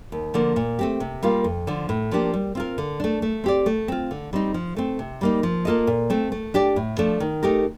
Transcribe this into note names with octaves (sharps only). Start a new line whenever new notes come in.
D#2
D3 F3 A#3
A#2
A3 C4 G4
C3
G3 A#3 F4
F2
D3 F3
A2
F3 A#3 D4 G4
G3
C4 F4 A#4
D3
A3 D4
A3
C4 G4 D5
A3
C4 F4
D3
G3 C4 D#4
F3
A3 C4
C3
G3 A#3 D#4
F3
A#3 F4 A4 D#5
A#2
A3 C4
A3
D4 G4 D5
A2
F3 A3 D4 A4
D#3
A3 D#4 G4 A#4